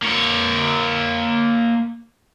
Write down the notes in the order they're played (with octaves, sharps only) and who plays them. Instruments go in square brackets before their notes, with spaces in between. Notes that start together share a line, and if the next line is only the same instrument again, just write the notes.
[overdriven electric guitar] A#3 C#5